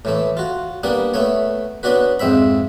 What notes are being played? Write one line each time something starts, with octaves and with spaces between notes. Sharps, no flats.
A2 E3 A3
F4 F#4
G3 A#3 B3 D4
A3 B3 C#5
B3 C#4 D4 F#4 B4
F2 G#2 C4 E5 B5